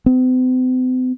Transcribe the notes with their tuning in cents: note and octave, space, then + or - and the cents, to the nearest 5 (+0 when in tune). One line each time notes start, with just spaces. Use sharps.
C4 -45